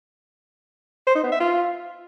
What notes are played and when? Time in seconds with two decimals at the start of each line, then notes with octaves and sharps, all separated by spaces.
1.07 C5
1.15 D#4
1.24 B3
1.32 E5
1.40 F4